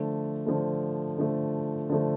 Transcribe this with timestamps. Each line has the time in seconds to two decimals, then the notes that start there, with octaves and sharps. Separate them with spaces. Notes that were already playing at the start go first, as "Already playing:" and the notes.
Already playing: D3 F3 A3
0.46 D3 F3 A3
1.18 D3 F3 A3
1.89 D3 F3 A3